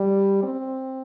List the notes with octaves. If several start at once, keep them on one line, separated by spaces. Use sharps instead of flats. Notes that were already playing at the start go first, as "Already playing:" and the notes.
Already playing: G3
C4